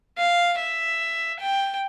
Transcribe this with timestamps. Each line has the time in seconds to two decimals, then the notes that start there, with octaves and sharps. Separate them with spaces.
0.18 F5
0.59 E5
1.40 G5